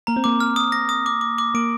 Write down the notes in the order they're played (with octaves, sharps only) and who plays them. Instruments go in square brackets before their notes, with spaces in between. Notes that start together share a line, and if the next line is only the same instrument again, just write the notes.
[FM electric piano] A#3 [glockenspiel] A#5
[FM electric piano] C4
[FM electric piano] A#3 [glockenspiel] D6
[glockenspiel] F6
D#6
A#6
D#6
D6
D6
D6
[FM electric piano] A#3 [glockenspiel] D7